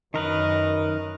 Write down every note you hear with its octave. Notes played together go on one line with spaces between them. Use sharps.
F#2 D#3 A#4 B4 D#5